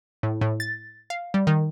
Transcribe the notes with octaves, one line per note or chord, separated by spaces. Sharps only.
A2
A2
A6
F5
G3
D#3